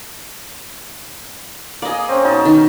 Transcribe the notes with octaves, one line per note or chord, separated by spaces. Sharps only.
A#3 G#4 D5 D#5
C4 C#4
B2 D#4 A5
D#3